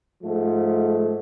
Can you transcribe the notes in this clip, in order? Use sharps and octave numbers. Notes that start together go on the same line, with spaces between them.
G#2 F3 A3